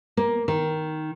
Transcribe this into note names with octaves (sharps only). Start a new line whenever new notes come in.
A#3
D#3